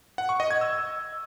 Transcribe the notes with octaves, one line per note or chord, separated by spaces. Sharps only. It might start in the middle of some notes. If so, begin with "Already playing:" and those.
F#5
C#6
D#5
G#6
E6